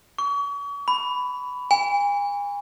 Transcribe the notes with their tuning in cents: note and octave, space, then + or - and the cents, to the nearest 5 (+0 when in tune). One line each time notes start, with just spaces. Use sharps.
C#6 +40
B5 +10
G#5 -40